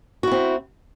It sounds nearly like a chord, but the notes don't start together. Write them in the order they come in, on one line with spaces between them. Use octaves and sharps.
F#4 E4 C4